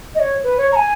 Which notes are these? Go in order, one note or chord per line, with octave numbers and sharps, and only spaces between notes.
D#5
C#5
B4
C#5
A#5
G#5